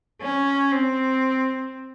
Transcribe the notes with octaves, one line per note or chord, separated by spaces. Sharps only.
C#4
C4